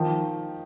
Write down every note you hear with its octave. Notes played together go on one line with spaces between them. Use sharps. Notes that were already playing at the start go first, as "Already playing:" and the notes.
Already playing: D#3 F3